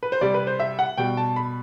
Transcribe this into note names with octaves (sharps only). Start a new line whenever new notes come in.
B4
C5
C3 G3 D5
B4
C5
E5
F#5
B2 G3 G5
A5
B5